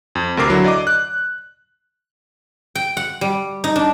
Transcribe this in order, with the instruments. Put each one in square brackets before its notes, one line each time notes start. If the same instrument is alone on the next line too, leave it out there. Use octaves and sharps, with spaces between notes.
[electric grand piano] F2
D2 C3 A#4 D6 C7
D3 F#3 E4
D5 D#5 D6
F#6
[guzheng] G5
F#5
G3
D#4
D4